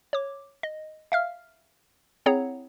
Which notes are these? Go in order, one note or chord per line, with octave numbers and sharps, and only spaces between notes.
C#5 D6
D#5
E5 F5 F6
C4 E4 G#4 C#5 F#5 A#5